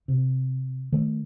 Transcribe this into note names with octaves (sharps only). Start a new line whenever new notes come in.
C3
D#3 A3